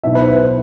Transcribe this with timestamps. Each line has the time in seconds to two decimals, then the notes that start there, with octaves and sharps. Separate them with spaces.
0.03 B1 B2 B3 E4 E5
0.15 B4
0.21 C5
0.38 C5